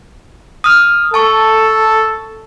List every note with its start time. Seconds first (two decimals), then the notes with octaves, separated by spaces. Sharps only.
0.64 D#6 F6
1.14 A4 A5 C#6